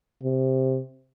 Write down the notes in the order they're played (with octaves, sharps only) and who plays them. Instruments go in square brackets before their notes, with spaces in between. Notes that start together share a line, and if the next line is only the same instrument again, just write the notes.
[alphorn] C3